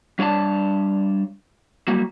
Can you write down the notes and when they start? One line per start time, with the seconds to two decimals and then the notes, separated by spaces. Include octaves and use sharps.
0.19 G3 D4 C#5 D5 A5
1.88 F#3 G3 A#3